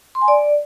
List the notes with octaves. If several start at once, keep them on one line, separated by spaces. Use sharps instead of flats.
C6
G#5
D5